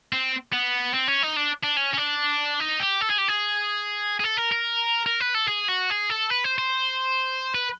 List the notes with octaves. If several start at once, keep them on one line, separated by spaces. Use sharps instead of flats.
C4
B3
C4
C#4
D#4
D4
D4
C#4
C#4
D4
D#4
G4
A4
G#4
G4
G#4
G#4
A4
A#4
A#4
A#4
B4
A4
G#4
F#4
G#4
A4
B4
C5
C5
B4